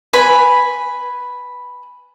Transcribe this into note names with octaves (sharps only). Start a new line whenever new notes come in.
B4 G#5 B5